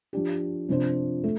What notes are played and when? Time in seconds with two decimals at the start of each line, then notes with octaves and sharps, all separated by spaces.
0.13 F3 D4 G4
0.69 C3 F3 D4 F4 C5
1.24 A3